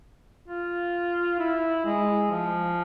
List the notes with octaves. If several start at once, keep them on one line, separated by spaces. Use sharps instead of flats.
F4
E4
G#3
F3